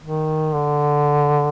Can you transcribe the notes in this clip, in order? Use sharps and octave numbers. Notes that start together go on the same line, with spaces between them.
D#3
D3